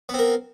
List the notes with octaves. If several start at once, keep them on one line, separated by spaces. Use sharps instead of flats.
B3 C4 A#4